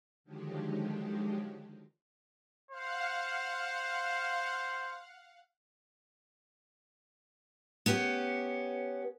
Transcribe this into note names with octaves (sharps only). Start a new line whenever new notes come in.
D3 D#3 F3 F#3 G#3 G4
C5 F5 F#5
B3 C#4 G4